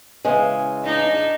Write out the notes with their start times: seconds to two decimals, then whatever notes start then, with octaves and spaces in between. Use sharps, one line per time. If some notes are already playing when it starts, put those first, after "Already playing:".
0.25 C#3 E3 G#3
0.84 D4 D#4